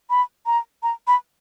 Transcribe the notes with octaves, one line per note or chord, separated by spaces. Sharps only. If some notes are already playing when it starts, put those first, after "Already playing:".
B5
A#5
A#5
B5